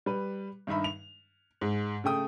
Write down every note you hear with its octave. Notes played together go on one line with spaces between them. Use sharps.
G3 B4
G2 D#3 D#4 E5 B5
F7
G#2
C#3 A3 G5 D#6